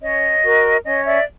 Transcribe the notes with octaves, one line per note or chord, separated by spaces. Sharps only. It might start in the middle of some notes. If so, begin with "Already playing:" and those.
C#4 C#5 D#5
F#4 A#4 C#5
C#4 C#5 D#5
D5 E5